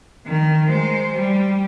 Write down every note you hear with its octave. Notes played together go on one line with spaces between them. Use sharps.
D#3
G#3 C5
G3